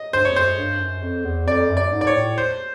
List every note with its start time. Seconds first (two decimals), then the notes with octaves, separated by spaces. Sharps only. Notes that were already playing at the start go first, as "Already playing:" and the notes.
Already playing: D#5
0.13 G2 C5
0.25 F2 C#5
0.36 F#2 C5
0.57 G2
0.80 F#2
1.02 F2
1.25 E2
1.47 F2 D5
1.69 F#2
1.77 D5
1.92 G#2
2.01 D5
2.07 C#5
2.15 A2
2.38 C5